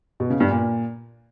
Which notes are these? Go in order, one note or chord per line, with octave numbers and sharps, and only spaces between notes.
B2
C#3
G2
A#2